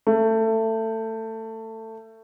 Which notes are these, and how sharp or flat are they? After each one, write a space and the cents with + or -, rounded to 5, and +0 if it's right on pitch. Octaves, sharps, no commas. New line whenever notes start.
A3 +20